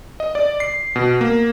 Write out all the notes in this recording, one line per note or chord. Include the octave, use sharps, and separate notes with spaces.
D#5
D5
C7
B2
A#3